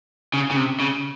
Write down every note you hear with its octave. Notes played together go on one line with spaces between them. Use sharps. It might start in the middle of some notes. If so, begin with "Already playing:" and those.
C#3
C#3
C3
C#3